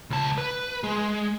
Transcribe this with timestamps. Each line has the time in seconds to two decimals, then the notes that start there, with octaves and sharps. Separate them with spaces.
0.10 C#2 A5
0.38 B4
0.84 G#3